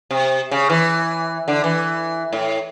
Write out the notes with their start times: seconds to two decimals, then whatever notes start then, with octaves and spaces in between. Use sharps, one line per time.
0.11 C3
0.51 C#3
0.70 E3
1.48 D3
1.64 E3
2.33 A2